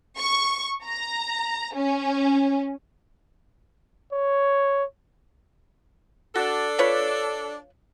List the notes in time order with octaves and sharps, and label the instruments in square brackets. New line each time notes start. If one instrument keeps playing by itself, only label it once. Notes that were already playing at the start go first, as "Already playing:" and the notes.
[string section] C#6
A#5
C#4
[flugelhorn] C#5
[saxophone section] D4 A4 [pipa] F#4
[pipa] F4 B4 C#5